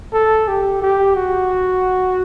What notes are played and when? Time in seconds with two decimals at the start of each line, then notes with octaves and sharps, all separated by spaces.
0.13 A4
0.48 G4
0.82 G4
1.16 F#4